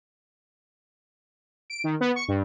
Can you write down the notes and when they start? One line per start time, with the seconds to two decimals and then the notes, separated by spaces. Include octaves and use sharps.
1.70 D7
1.84 D#3
2.01 B3
2.16 C#6
2.28 G2